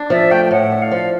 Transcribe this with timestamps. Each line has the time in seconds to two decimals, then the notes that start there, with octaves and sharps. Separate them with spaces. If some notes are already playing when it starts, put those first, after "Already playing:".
Already playing: D4
0.10 F3 E5
0.31 A3 G5
0.45 G5
0.51 A2 F#5
0.72 D4
0.82 F5
0.92 F3